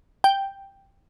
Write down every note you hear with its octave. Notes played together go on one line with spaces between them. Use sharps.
G5